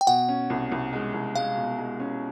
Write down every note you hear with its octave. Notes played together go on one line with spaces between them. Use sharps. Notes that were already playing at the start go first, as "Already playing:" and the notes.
G5
B2 F#5
C#4
C2
C2
G#3
C2
G#3 F5
B2
G#3
C#4